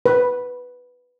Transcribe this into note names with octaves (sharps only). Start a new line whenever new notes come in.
B4